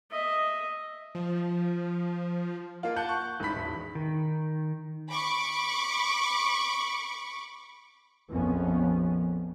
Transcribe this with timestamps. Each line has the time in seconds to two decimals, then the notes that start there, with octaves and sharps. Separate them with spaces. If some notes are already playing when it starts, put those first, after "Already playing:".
0.11 D#5 E5
1.15 F3
2.83 A#3 F4
2.96 F#5 A5 F#6 G6
3.09 C#6
3.40 A1 G#2 B5 B6
3.56 E1
3.95 D#3
5.10 B5 C#6 D6
8.29 A#1 F2 F3 B3 C#4